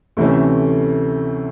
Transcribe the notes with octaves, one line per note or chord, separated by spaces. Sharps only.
D2 C3 E3 A3 C#4